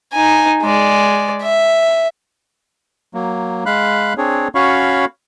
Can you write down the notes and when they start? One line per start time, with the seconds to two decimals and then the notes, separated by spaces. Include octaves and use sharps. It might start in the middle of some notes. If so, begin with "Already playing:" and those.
0.13 D#4 G#5
0.62 G#3 D5
1.43 E5
3.14 F#3 A#3
3.66 G#3 F5 B5 F#6
4.18 C4 D4 G#4 C#5
4.55 C#4 F#4 C#5 F5 B5 C#6